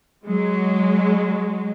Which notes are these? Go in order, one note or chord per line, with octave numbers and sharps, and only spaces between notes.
F#3 G#3